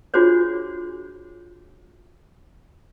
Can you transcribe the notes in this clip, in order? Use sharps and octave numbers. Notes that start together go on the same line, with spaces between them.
D4 F4 F#4 G#4 C5 C#5